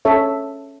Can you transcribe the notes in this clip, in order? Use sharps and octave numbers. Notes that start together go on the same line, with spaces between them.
C#4 A4 C#5 E5